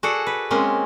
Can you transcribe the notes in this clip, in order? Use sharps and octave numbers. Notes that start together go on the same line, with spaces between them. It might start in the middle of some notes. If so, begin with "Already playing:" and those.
F#4 G#4 A4 D5 F#5
B4
G#3 A#3 C4 C#4